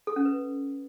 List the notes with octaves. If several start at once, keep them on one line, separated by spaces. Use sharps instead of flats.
A4
C#4
B4